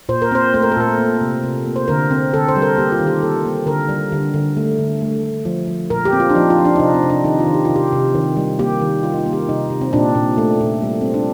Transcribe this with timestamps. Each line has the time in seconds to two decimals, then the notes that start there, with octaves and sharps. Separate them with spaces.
0.09 A#2 C5
0.22 A#4
0.32 C4 C5
0.54 A3 C5
0.62 A#4
0.72 A4
0.76 A#2 A#4
0.98 A#3
1.21 C3
1.43 C3
1.65 A#3
1.76 C5
1.88 D3 A#4
2.11 C4
2.33 D3 A4
2.48 C5
2.56 G3
2.62 A#4
2.77 A#3 G4
2.92 F4
2.99 D#3
3.07 G4
3.22 A#3 A4
3.45 A#3
3.66 D3 A#4
3.89 G3
4.12 D3
4.34 D3
4.57 A3
4.79 D3
5.02 A3
5.23 A3
5.45 F3
5.68 F3
5.90 A#2 A#4
6.05 G4
6.13 C4
6.20 F4
6.30 D4
6.35 F3 D#4
6.50 F4
6.58 F3
6.65 D4
6.76 D#4
6.79 C3 D4
6.94 C4
7.03 C3
7.10 D4
7.24 D#3 D#4
7.40 F4
7.47 D#3
7.54 G4
7.65 C3 F4
7.76 G4
7.92 C3
8.15 D#3
8.37 G3
8.59 A#3 G4
8.81 D#3
9.03 G3 F4
9.14 D#4
9.18 F4
9.26 A#3
9.33 G4
9.49 C3 D#4
9.70 C3
9.81 C4
9.93 A#2 D4
10.15 A#2
10.38 A3
10.61 A#2
10.82 G3
11.01 G3 C4
11.14 D4